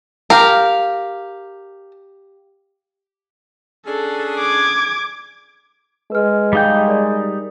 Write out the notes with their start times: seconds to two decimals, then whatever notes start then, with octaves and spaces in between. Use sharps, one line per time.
0.30 G4 A#4 F5
3.87 C#4 D4 G#4 A4
4.39 D6 G#6
6.12 G#3 B4 F6
6.53 G3 D#4 G#4 F5 G5 G6
6.87 A#4 D5